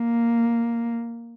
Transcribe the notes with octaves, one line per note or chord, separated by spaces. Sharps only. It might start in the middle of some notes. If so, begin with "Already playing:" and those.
Already playing: A#3